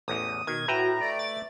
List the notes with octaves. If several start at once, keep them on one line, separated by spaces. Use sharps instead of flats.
A1 E2 D#6
B2 D#3 G#6
A2 F#4 B4 E5 G5 A#5
A3 D5 D7
A6